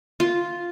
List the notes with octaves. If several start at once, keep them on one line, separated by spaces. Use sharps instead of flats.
F4